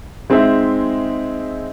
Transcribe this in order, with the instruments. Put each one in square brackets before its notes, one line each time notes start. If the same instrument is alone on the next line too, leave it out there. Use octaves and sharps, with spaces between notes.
[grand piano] G#3 C4 D#4 G#4 E5